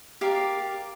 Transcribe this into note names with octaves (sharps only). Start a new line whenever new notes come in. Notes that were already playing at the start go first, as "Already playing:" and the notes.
G4 A#4 D5 F5